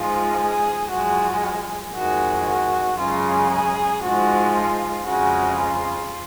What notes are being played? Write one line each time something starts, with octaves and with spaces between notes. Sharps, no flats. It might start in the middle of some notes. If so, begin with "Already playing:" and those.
Already playing: G#2 F3 G#3 F4
G#4
F#2 F3 G#3 F#4
F2 D#3 G#3 F#4
F#4
F#2 C#3 G#3 F4
G#4
G#2 F3 G#3 F#4
F4
F2 C#3 G#3 F#4
F4